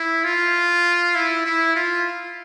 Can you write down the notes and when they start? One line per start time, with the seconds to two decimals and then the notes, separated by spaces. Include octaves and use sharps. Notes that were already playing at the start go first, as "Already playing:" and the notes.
Already playing: E4
0.24 F4
1.15 E4
1.46 E4
1.76 F4